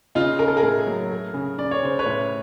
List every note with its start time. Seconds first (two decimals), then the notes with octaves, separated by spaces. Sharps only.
0.15 C#3 D#4 F4
0.39 C#3 A#4
0.48 A4
0.57 G#4 A#4
0.63 A2
0.86 F#3
1.11 A3
1.34 C#3
1.58 C#3 D5
1.71 C#5
1.82 C#3 C5
1.99 B4 C#5
2.06 A2